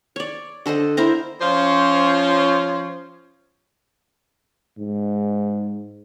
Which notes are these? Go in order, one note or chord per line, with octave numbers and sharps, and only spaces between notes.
C#5 D5
D3 A4 C5 D#5
E4 A#4 C5 A#5
F3 C#4 F4 C5 C#5
G#2